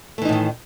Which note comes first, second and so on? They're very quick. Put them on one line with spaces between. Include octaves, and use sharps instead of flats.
A3 E3 D#4 A2 D#3